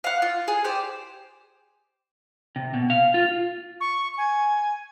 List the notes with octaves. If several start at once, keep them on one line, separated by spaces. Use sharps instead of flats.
F5 F#5
F4
G#4
G4 C5 D5
C3
B2
F5
F4
C#6
G#5